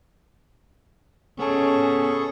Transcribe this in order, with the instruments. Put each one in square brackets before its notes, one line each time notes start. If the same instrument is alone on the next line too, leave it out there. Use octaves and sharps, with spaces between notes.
[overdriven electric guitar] B3 A5 [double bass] C#4 [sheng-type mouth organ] G#4 A4 C#6